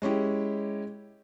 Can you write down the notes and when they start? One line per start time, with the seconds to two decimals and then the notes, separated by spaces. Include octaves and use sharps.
0.02 G#3 C#4 E4 G4